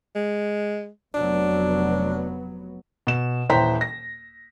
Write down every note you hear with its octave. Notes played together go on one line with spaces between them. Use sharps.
G#3
F1 F#3 B3 D4
B2 E7
D#1 E3 C5 G5 A#5 B6
A#6